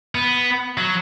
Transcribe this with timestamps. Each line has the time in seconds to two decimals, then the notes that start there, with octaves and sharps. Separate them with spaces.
0.15 B3
0.78 F#3